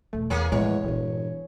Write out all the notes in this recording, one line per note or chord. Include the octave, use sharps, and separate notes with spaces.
E2 B2 A3
E2 E3 A#3 G#4 C#5
E2 A2 F3 G#3 C#5
E1 G2 A#2 E3